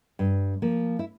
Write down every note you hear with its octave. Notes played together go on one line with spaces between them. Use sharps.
G2
F3 A#3
E4